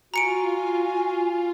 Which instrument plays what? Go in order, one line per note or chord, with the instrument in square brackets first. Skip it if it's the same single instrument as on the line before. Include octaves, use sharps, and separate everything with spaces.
[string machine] F4 [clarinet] F#4 [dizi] G#5 [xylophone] A#5 C#7 D7